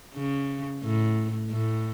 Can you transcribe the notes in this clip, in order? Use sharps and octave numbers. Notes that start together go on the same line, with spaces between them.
C#3
A2
A2